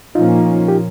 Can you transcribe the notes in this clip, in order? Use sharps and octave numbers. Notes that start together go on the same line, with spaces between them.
A#2 F3 A#3 C#4 D#4 F4
G4